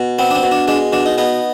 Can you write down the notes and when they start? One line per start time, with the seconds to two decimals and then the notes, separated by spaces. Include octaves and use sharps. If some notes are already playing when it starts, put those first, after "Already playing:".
Already playing: B2
0.19 B3 C4
0.31 D4
0.35 C4
0.43 B2
0.52 D4
0.68 G#3 D4
0.93 B2 D4
1.06 D#4
1.18 B3 D#4